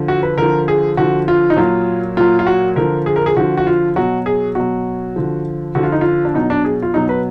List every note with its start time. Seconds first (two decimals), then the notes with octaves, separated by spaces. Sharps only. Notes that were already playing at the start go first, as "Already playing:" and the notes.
Already playing: D3 F3
0.08 F#4
0.23 B4
0.37 D3 F3 A#4
0.68 G#4
0.97 D3 F3 F#4
1.28 F4
1.50 D#4
1.57 A#2 F#3 F4
2.17 A#2 F#3 F4
2.39 F4
2.47 F#4
2.76 D3 F3 A#4
3.06 G#4
3.16 A#4
3.26 G#4
3.36 D3 F3 F#4
3.57 F#4
3.67 F4
3.96 B2 F#3 F#4
4.26 G#4
4.55 B2 F#3 F#4
5.16 D3 F3
5.75 D3 F3 F#4
5.83 F4
5.92 D#4
6.01 F4
6.25 D4
6.34 B2 F#3 D#4
6.50 D4
6.65 G#4
6.82 F4
6.94 B2 F#3 D#4
7.09 B4